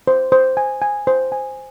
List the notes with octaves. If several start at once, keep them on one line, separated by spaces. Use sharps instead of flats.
C5
C5
G#5
G#5
C5
G#5